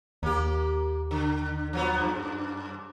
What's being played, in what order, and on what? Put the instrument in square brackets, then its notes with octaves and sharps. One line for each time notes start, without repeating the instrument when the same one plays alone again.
[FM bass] D#2 [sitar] A#3 G4
[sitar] D3
F3 F#3 B3
F#2